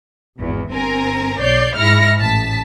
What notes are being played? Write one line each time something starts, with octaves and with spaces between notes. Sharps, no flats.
G#1 E2
G1 C4 A#4 G#5 A#5
B1 C#5 D5 G6 C7
G#2 E4 F6 A#6 C#7
A1 A5 B6